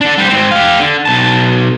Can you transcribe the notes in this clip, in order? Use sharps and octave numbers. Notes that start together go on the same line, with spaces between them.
D3 D4
G3 C5
G#2 C4
G4 F5
D3
B1 A5